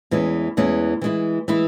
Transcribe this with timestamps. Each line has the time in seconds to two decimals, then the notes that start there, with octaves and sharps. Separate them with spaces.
0.11 E2 E3 G#3 C#4
0.57 E2 E3 G#3 C#4
1.02 E3 G#3 E4
1.48 E3 G#3 E4